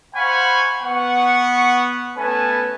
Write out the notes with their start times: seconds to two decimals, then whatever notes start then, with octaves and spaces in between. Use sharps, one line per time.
0.15 C5 F5 F#5 G#5 B5 C#6
0.80 B3 F#5 C#6
2.15 A3 B3 C#4 B4 G#5 A5